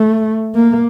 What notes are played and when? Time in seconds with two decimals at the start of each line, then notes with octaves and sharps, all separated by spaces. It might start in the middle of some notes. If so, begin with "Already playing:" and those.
Already playing: A3
0.55 A#3